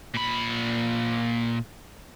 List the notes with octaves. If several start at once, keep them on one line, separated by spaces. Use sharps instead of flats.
A#2 B5